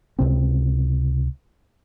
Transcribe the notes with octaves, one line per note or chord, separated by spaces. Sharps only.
C#2 C3 C4